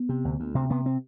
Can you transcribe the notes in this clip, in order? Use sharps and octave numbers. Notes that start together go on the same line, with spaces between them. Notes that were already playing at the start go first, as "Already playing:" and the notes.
Already playing: B3
C3
D2
D2
C3 C4
C3 B3
C4